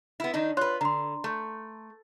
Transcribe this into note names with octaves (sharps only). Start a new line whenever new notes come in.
B3 E4
D#3 D4 D#4
F4 B4 C#5 C6 F#6
D3 A#5 C6
A3